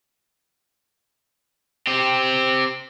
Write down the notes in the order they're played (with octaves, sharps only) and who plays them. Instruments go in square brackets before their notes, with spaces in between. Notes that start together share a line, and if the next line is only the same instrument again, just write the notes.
[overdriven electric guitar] C4 G4